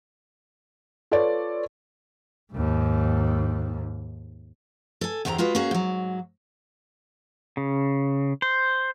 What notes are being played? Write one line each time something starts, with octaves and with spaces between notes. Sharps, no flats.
F4 A4 B4 C#5 D5
D#2 G#2
A4 G#5
E2 D3 G4 C5 A#5
G#3 F4 F#4 B4
A#3 C#4 F#4 G#4
G#2 F#3
C#3
C5